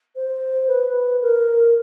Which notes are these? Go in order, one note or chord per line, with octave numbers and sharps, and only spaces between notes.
C5
B4
A#4